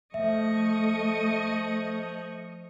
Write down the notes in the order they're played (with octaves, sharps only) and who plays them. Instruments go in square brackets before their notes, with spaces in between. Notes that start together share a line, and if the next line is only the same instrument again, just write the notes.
[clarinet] F3 [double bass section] A3 [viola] D#5 C#6 [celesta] E5